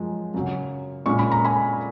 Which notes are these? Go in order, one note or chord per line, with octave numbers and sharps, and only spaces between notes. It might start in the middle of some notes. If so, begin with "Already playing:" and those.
Already playing: F#2 F3 G#3
F#2 C#3 F#3
A#2 G#3 C#4 C#6
B5
A#5
G#5 B5